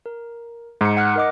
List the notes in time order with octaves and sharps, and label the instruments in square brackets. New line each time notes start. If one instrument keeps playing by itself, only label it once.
[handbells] A#4
[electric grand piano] G#2 [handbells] D#4 C#7
[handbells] F#5 F6 F#6
A#4 D#5 D6